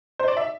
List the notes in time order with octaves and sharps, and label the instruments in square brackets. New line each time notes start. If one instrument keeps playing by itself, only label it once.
[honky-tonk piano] C5
D5
E5